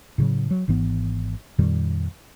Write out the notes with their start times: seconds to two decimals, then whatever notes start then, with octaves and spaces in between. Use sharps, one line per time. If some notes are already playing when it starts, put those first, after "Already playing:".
0.18 A2 C#3 F#3
0.51 F#3
0.68 G#1 G#2 E3 B3
1.59 F2 A#2 D#3 G3